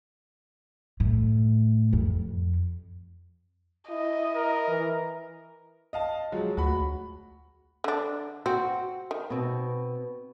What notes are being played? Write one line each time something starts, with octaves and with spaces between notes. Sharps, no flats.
A2
F2
E4 D#5
A#4
E3
D#5 F5 A5
F3 F#3 G#3
D2 F#4 B5
D3 D4
C4 F#4
D#3
B2 C4